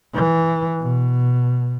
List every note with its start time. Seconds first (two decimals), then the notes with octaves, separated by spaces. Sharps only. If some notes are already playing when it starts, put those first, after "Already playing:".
0.13 E3
0.80 B2